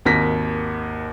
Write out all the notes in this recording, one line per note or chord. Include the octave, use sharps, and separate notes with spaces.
G#1 D#2 A#4 A#6 B6